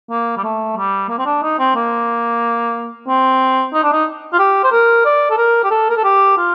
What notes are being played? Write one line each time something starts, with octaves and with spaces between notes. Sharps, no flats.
A#3
G3
A3
G3
A#3
C4
D4
D#4
C4
A#3
C4
D#4
D4
D#4
F4
G4
C5
A#4
D5
A4
A#4
G4
A4
A#4
A4
G4
F4